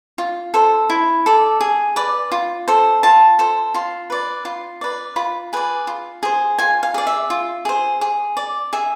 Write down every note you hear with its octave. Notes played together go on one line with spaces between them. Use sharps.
F4
A4 C5
E4
A4 D5
G#4
B4 D5
F4
A4 C5
F4 A5
A4 C5
F4 C6
B4 D5
F4 C6
B4 D5
F4 B5
G#4 B4 D5
F4
G#4 C5
F4 G#5
F5
G#4 D5
E5
F4
G#4 C5
G#4
D5
G#4 E5